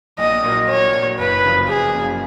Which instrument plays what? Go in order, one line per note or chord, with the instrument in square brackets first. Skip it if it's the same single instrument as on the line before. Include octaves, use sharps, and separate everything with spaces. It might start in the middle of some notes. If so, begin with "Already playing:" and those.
[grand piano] A#1 [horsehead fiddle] D#5
[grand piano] A#2 F#3 A#3
[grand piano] A#1 [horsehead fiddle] C#5
[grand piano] A#2 F#3 A#3
[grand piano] F#1 [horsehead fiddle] B4
[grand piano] F#2 C#3 F3 A#3
[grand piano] F#1 [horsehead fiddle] G#4
[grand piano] F#2 C#3 F3 A#3